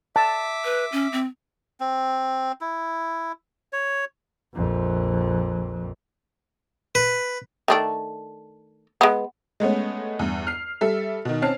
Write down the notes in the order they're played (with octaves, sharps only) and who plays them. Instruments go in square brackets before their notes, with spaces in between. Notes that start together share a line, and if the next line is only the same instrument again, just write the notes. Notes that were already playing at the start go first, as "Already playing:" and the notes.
[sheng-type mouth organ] E5 D6 [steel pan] A5
[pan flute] B4
C#4
C4
[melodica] C4
E4
C#5
[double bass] A#1 F2
[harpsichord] B4
[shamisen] D#3 A3 D4
G#3 B3
[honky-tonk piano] G#3 A3 B3 C#4
E2 G2
F6 C7
G3 A4 E5
B2 D#3
C4 C#4 A5 F6 C7